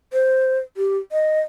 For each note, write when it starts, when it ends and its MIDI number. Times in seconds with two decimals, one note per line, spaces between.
0.13 0.59 72
0.77 0.98 67
1.12 1.41 75